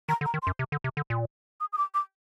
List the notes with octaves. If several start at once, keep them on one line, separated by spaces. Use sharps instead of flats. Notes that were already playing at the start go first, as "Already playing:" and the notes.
D#3 A#5
D3
A#5
D#3
C6
F#2
C3
D3
C3
D3
A#2
D#6
D#6
D6
D6